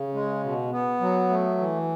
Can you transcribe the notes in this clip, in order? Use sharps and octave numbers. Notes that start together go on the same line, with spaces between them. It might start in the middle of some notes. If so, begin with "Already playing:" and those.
Already playing: C#3
G#3
B2
B3
F#3
A3
E3